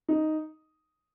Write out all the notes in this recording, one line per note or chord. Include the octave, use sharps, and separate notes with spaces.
D#4